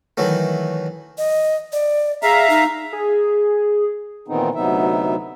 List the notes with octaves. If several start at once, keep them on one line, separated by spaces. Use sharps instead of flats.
D#3 E3 F#3 A3
D#5
D5
G#4 E5 F5 A#5
D#4
G#4
A#2 D#3 E3 B3 C4 D#4
D2 C3 F#3 B3 D#4 E5